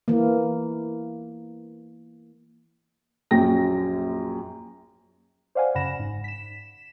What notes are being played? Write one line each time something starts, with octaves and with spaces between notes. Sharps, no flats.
E3 A#3
A#1 F#2 G5 A#6
C5 D5 F5 F#5 G#5
F#2 C#3 F#5 B5 A#6 E7
G1 G#2
B6 E7